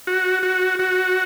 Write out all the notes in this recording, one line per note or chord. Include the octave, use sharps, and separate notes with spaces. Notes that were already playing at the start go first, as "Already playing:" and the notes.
F#4
F#4
F#4